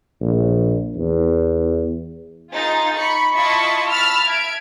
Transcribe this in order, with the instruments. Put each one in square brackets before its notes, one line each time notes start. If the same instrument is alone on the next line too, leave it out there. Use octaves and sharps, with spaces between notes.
[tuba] A#1
E2
[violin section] D#4 F4 G#4 A6
B5 C#6 C#7
E4 F4 D#5 A5 B5 C#6
A5 B5 E6 F6
E5 G#6 D7